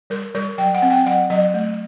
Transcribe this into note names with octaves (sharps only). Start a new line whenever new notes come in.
G3 A#4
G3 A#4
F#3 G5
F#5
C4
G5
F#3 F#5
F#3 D#5
A3